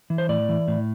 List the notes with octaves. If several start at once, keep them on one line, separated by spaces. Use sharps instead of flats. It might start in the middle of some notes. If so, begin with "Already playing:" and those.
E3
C5
A2 D5
E3
A2